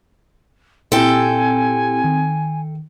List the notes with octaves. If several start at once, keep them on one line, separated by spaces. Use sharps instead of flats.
A#2 C4 E4 G4 A4 G5 G#5
D#3